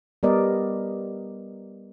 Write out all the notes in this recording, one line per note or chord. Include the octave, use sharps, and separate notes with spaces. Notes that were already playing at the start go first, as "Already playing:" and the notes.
G3 B3 A#4 D5 D#5